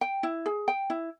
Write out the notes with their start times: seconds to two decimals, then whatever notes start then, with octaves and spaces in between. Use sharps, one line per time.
0.01 G5
0.23 E4
0.46 G#4
0.68 G5
0.90 E4